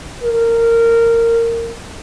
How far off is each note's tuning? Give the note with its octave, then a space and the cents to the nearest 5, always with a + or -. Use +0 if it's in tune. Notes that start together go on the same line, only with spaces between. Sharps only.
A#4 -15